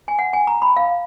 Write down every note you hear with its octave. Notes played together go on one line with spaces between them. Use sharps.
G#5
F#5
G#5
A#5
B5
F5